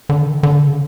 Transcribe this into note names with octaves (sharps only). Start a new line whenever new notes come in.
D3
D#3
D3
C#3